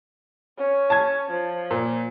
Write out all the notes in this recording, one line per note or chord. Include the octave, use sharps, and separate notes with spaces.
C#4
A5 G#6
F3
A#2